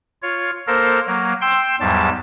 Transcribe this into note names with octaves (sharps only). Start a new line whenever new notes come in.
F4 C#5
A#3 A4 A#4 C5
F#3 A#3
G5 C6 E6
E2 G#2 F#3 G3 A5